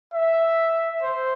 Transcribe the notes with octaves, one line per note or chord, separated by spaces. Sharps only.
E5
C5